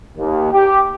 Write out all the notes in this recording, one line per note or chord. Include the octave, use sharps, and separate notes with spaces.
D#2
G4